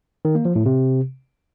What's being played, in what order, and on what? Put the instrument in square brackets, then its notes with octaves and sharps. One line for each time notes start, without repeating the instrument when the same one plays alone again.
[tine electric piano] D#3
A#3
F3
A2
C3